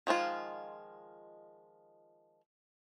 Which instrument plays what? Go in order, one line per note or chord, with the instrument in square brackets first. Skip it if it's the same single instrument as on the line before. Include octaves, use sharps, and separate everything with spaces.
[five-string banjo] D#3 F3 G#3 F4